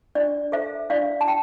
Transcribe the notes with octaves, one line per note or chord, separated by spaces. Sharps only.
D4 D5
A4 C5 E5
D4 D5 F5
A5
G5